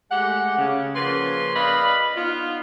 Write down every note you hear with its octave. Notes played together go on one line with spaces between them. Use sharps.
G#3 A3 G4 F#5
C#3
C#3 F3 A#3 B4 C6
B4 D5 D#5 F5 B5
B3 D#4 F4